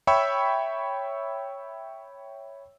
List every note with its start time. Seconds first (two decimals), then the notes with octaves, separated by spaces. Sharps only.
0.07 C#5 E5 G5 B5 C#6 E6